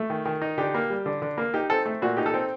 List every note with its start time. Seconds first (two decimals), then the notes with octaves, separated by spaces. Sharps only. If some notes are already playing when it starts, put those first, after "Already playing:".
Already playing: A3
0.10 D#3
0.25 D#3
0.42 D#4
0.58 D3 G4
0.74 A#3
0.90 G3
1.06 D3
1.22 D3
1.38 A#3
1.54 D#4 G4
1.70 C4 A4
1.86 A3
2.02 A#2 F#4
2.17 D#4 G4
2.26 A4
2.34 C4